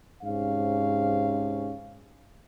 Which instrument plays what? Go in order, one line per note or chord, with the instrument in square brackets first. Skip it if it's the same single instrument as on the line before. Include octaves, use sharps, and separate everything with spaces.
[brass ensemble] G#2 C3 C#4 F5